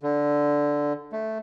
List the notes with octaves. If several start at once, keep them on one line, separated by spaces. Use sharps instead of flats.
D3
A3